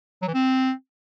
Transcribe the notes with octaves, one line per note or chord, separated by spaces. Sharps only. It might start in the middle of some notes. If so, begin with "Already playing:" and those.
F#3
E3
C4